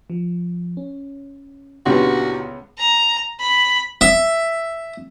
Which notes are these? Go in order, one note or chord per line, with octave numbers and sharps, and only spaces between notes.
F3
C#4
C#2 A#2 D3 B3 E4 F#4 G4 C6
A#5
B5
E5